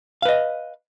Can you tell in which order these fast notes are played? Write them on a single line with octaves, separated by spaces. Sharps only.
F5 B4 D#5